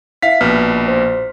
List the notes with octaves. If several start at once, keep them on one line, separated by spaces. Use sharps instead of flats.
E4 F5 B6
A#1 B2 B4 F6
C5